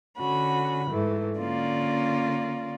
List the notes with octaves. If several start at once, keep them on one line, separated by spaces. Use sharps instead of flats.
D3 C#4 F#4 B5
G#2 E3 A3
D3 A#3 C#4 F4 D5